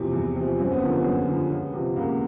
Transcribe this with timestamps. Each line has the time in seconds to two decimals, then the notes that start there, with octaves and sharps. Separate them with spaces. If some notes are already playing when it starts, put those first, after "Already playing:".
Already playing: E2 C3 F3 E4
0.13 E2
0.36 C3 F3
0.59 F#2 C4
0.72 B3
0.81 D3 F3 A#3
0.96 B3
1.05 F#2
1.28 D3 F3
1.50 C#2
1.73 C3 F3
1.96 C#2 A#3